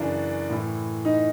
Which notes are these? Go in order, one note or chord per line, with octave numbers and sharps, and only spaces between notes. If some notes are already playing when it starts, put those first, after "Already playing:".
Already playing: F#2 C#3 E3 D4
A2 E3
D#4